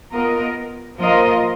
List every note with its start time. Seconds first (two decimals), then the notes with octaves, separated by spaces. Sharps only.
0.12 B3 F4 A#4 D#5
0.98 F3 A#3 F4 A#4 D#5